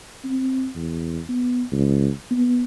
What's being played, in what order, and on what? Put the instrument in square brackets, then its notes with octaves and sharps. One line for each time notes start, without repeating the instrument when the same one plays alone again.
[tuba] C4
E2
B3
C#2
B3